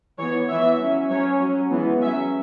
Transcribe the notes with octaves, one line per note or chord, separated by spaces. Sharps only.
E3 B3 C#5
E3 B3 E5
F#3 C#4
F#3 C#4 C#5
F#3 C#4
E3 G#3 B3
F#3 C#4 E5